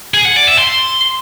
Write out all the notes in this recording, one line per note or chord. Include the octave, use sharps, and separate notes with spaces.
G#4
F#5
D5
E5
C6